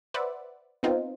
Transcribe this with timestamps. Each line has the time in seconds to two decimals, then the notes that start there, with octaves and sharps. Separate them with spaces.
0.14 B4 C5 D5 E5 F#5
0.83 B3 C4 D#4 F4